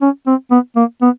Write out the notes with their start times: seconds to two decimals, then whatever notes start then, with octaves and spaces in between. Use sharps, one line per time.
0.01 C#4
0.27 C4
0.51 B3
0.76 A#3
1.02 B3